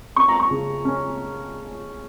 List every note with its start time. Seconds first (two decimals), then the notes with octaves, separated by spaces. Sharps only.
0.16 C#4 C#6
0.28 A#5
0.40 C#6
0.51 C#3
0.85 C#4